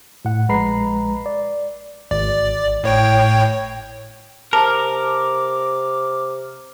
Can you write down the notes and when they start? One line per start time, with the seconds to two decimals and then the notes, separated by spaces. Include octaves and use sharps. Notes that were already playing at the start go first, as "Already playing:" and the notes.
0.25 A2 F#5
0.49 A#1 G#3 B4 A#5 B5 C7
1.26 D5
2.11 G#1 D5
2.83 A2 C#5 G5
4.53 C3 A#4 A5 D6